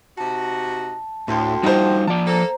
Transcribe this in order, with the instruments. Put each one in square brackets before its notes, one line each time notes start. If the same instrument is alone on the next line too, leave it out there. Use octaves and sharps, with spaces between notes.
[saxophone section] C3 D#4 F#4 [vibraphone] A5
[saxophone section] D2 [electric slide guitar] A2 [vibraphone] G5 A5 C6
[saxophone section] G2 D#3 F3 [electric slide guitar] G3 D#4 [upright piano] F#4 C5
[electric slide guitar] F3 D5 [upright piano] A5
[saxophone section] A#3 A4 [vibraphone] C5 A#5